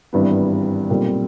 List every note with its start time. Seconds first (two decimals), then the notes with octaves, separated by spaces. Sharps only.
0.13 G#1 G2 E3 G3 B3
0.90 B1 A#2 G3 C4